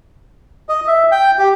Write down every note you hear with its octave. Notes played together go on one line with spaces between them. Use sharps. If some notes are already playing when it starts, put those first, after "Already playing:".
D#5
E5
G5
G4